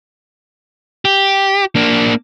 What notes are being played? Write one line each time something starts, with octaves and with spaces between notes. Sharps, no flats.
G4
A#3 D4